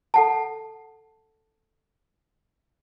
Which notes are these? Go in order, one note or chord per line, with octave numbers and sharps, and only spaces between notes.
A4 F#5 A5